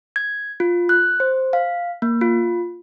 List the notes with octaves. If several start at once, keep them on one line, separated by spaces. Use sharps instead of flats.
G#6
F4
F#6
C5
F5
A#3
F4